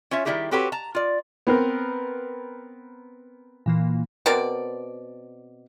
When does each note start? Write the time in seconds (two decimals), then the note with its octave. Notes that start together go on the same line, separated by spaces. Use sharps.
0.11 C#4 F4 C#5 E5
0.25 D#3 G3 D#4 E4 G4 G#4
0.51 C4 F#4 G4 A4 B4 C#5
0.72 A5 A#5
0.95 F4 D5
1.47 B3 C4 A#4
3.66 A#2 E3 A#3
4.26 B2 C4 A#4 D5